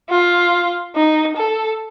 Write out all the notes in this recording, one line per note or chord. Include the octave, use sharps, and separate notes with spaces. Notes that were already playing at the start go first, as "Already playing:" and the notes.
F4
D#4
A4